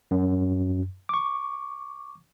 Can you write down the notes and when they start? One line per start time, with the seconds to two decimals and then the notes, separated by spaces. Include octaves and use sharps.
0.11 F#2
1.09 C#6 D6